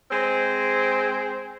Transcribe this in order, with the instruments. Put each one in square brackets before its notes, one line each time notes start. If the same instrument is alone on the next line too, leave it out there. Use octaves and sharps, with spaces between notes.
[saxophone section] G#3 C4 C5